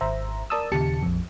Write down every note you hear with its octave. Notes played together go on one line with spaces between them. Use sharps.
G#1 C5 E5 A#5
A#4 D5 A5 D#6 E6
D#2 A#2 C#3 G4 A5 C#7
A#1 F2